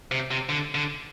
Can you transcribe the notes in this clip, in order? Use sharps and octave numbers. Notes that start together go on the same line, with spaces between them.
C3
C3
D3
D3